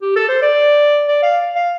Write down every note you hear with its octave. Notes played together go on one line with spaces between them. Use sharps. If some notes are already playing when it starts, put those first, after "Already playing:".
G4
A4
C5
D5
D5
F5
F5